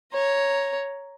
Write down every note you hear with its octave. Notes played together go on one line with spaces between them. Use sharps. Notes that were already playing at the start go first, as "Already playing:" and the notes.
C#5 A#5